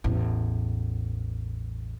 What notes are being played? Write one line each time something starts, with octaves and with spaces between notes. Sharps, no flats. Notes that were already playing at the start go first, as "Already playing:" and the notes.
A1 E2